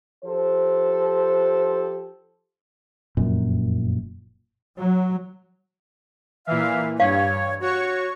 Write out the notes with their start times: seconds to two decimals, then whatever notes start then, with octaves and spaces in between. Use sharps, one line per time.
0.24 F3 G4 A4 C5
3.17 F1 F#2 A#2
4.79 F#3
6.47 A#2 E3 E5 F5
7.00 G2 C#5 F5
7.61 F#4 C#5 C#6